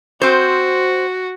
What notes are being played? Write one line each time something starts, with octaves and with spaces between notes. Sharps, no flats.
C4 F#4 C5